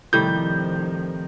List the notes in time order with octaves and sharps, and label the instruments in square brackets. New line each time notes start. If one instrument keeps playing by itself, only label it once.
[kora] A2 C3 G3 [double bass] D#3 F3 [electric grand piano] G6